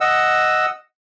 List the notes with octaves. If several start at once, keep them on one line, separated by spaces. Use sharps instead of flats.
D#5 F#5 E6